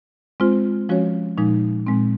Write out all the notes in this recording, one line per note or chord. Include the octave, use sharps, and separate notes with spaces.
G#3 C4 F4 C5
F3 G#3 C#4 F#4 C#5
A#2 F3 G#3 D#4
A#2 G#3 C4